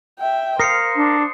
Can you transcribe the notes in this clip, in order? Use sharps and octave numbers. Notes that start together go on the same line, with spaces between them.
E5 G5
A#4 C5 F5 D#6 C7 C#7
D4